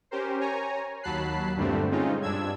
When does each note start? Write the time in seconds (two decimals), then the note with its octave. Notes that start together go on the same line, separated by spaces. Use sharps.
0.11 C#4 G4 A#4 C5
0.40 C#5 G#5 A#5
1.03 D#2 F#3 A5 B5 F#6 C7
1.57 G2 A#2 D3 G3 A3 C4
1.91 G#3 C4 C#4 D#4 F4
2.22 G2 D4 E6 G#6